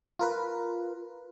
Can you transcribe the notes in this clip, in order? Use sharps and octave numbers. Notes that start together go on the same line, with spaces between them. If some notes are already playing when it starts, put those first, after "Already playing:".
F4 A#4 B4